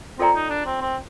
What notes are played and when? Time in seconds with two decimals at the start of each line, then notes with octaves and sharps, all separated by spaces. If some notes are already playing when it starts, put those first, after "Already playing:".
0.19 C4 F4 A4 D5 G5 A#5
0.35 D#4
0.50 D4
0.66 C4
0.81 C4